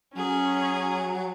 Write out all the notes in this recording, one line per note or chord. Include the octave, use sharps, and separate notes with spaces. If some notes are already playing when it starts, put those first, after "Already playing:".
F#3 C#4 G#4